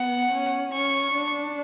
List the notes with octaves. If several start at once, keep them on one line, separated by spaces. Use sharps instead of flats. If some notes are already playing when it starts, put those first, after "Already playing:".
Already playing: B3 F#5
C#4
C#4 C#6
D4